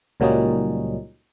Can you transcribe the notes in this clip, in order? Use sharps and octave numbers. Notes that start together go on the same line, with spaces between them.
C#2 A#2 F#3 G3 C#4 D#4